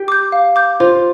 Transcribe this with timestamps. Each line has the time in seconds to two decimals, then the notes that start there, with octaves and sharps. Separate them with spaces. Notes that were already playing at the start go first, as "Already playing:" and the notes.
Already playing: G4
0.08 D6 G6
0.32 F5
0.56 D6 G6
0.80 F4 C5